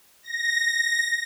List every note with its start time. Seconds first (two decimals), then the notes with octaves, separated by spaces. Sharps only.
0.23 A#6